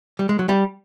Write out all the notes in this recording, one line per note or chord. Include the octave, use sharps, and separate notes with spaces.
G3
G#3
F#3
G3